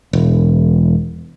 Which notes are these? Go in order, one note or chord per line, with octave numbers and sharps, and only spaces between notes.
E1